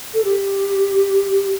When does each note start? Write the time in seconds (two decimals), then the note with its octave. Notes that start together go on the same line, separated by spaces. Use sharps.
0.14 A4
0.25 G4